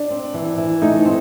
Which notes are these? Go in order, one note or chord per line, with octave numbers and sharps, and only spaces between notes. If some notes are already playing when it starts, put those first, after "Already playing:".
Already playing: D4
C4
E3
E3
A3 D#4
C4